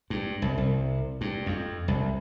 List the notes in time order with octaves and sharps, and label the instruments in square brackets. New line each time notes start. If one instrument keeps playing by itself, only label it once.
[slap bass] G2
C2
C2
G2
F2
C2